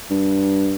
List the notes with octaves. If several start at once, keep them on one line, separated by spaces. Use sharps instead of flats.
G2